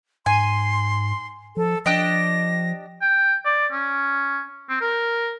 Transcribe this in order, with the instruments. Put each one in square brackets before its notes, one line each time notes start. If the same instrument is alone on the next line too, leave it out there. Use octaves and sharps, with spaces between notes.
[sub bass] G#2 [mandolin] G#5 [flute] C6
[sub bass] F3 [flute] A4
[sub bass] F3 [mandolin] D4 G4 D#5 [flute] A#6
[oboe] G5
D5
C#4
C4
A#4